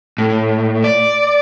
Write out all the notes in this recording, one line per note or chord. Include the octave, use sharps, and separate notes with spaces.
A2
D5